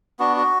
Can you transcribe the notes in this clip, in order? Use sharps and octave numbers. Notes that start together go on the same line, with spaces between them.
B3 D4 F#4
F#4